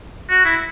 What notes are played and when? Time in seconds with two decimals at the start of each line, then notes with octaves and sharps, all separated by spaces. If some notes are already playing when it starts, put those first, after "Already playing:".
0.30 F#4
0.45 E4